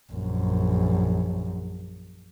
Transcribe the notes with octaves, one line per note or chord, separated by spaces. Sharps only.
A#1 F#2